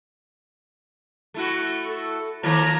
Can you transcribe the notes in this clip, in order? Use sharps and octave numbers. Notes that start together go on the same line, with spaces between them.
A3 E4 F#4
A4
D#3 F3 A#3 C#5 A5 A#5